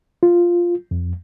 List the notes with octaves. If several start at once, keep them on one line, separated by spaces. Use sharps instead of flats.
F4
F2